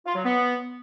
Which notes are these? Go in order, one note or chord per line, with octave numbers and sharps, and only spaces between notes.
F4
F#3
B3